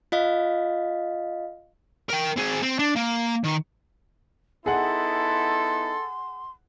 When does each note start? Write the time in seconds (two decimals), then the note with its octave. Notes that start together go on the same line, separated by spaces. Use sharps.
0.12 F4 D#5 F5
2.10 A#4 G5
2.38 C4 G#4
2.63 C4
2.79 D4
2.96 A#3
3.44 D#3
4.66 B3 D#4 E4 G#4 A4 F#5 C6